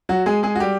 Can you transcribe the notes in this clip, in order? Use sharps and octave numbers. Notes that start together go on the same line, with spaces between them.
F#3 F#4
G#3 G#4
G#3 G#4
F#4
G3 G4